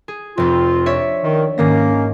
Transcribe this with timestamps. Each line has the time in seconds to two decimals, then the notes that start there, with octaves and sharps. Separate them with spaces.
0.08 G#4
0.38 F1 F2 C4 F4
0.86 D4 C#5 E5
1.24 D#3
1.58 G#2 D#3 A#3 C#4 A#6